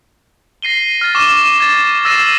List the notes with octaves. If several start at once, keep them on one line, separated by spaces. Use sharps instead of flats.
A#6 C7 D#7 G7
F6 A6
C#6 D6 E7 G7
G#6 A6
E6 A6 A#6 C7 D#7 E7